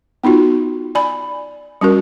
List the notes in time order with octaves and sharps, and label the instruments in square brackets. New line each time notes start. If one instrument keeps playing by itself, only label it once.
[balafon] B3 D#4 F4 F#4
D5 G#5 B5
G3 C#4 F#4 A#4